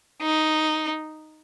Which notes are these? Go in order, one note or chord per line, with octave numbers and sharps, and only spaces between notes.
D#4